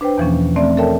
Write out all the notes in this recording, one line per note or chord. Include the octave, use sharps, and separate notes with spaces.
D4 B4 C5 G5
E2 B2 E3 F3 A#3 C#4
A3 C4 D5 E5
A4 A#4 C#5 E5 G5 A5